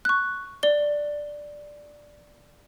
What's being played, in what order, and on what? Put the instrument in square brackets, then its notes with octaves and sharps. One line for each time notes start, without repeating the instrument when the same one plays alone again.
[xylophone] C#6 F#6
D5 G7